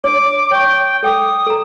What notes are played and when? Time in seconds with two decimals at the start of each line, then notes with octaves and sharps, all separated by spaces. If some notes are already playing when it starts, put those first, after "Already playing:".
0.04 D4 C#5 D6
0.51 C#5 G5 C#6
1.03 A4 G5 D6 D#6
1.47 A4 A#5